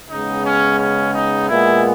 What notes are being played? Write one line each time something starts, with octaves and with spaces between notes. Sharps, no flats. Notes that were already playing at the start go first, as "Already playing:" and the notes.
C#3 G#3 B3 D#4
C#4
C#4
D#4
A#2 G#3 B3 E4